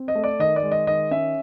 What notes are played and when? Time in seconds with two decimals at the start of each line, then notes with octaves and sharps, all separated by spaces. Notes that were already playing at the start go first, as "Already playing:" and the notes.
Already playing: C4
0.08 D#5
0.15 A3
0.24 D5
0.39 D#3 D#5
0.56 D5
0.63 G#3
0.72 D#5
0.87 D#3 D#5
1.11 C#4 E5